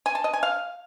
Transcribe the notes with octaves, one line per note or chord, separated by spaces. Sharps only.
G#5
A5
D#5
G#5
F5